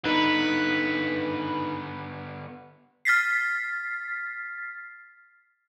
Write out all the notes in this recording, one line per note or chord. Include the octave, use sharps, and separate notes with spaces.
D3 B3 D#4 B4
F6 A6 B6 C7